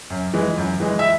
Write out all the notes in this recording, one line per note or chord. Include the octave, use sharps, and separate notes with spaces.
F#2
E3 G#3
F#2
E3 G#3
E5